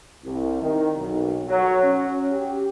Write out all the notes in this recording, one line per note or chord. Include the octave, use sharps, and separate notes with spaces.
C2
D#3
B1
F#3
C#4
G4